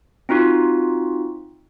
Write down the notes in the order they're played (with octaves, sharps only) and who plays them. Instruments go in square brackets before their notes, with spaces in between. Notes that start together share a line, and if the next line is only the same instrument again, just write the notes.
[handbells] C4 D#4 F4 F#4